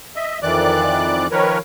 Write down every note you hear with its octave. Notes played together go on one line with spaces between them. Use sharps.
D#5 E5
F2 D#3 E3 D5 D6 F#6
D#3 F3 A#4 B4 C#5